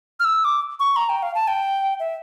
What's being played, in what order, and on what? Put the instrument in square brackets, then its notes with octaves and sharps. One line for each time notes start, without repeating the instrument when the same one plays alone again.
[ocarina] F6
E6
D6
C#6
A#5
G5
F5
A5
G5
E5